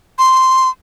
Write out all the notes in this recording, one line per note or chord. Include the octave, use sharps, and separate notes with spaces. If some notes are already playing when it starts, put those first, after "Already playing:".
C6